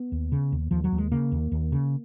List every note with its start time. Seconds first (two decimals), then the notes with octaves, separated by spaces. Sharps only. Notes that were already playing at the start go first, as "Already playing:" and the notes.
Already playing: B3
0.12 D#2
0.32 C#3
0.52 D#2
0.71 D#2 F3
0.84 F#3
0.92 D#2
0.98 G#3
1.12 C#3 A#3
1.32 D#2
1.52 D#2
1.72 C#3